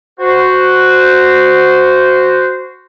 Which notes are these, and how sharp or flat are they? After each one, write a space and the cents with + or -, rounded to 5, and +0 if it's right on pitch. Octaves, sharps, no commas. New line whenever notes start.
F#4 +0 C5 -15